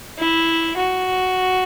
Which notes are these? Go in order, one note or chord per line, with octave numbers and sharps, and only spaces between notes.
E4
F#4